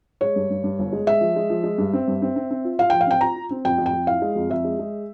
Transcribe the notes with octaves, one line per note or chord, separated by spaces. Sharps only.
G#3 C#5
G2
G2
G2
G1
G#3
G#3 E5
F3
G#3
F3
G#3
G2
C4
G2
C4
C4
C4
F4
F4 F5
F3 G5
F5
C4 G5
F4 A#5
F4
C4
F2 G5
F2
G5
F2
E4 F5
G#3
F2
F2 E5
G#3
G#3